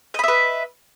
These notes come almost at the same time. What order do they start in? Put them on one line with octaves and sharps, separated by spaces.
D#5 B5 E5 B4